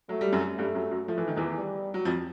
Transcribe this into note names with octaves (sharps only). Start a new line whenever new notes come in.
F#3 A3
G3
F#2 F#3
G2 G3 A3
F#2 F#3
F#2 F#3
F3 A3
E3
D#3
E2 E3
G3
F#3
F2 F3